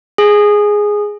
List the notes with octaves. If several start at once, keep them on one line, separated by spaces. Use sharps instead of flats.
G#4